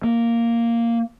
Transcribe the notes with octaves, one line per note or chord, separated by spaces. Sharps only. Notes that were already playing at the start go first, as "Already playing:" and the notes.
A#3